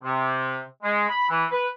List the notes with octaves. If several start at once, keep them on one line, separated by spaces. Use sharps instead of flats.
C3
G#3
B5
E3
B4